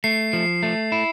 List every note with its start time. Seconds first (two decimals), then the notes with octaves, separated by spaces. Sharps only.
0.04 A3 C7
0.33 F3
0.63 A3
0.92 E4